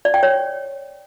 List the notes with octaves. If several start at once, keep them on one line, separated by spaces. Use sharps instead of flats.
D5
G5
C#5